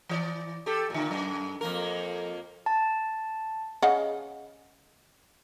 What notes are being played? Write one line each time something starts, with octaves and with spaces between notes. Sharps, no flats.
E3 C#5 D5
G4 A4
A#2 D3
F#2
F2 A#3 A#4
A5
C#3 D#5 F#5